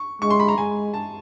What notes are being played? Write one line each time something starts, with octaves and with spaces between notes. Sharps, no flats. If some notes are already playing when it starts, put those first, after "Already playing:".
Already playing: C#6
G#3 C#6
C6
B5
A#5
G#3 G#5
A5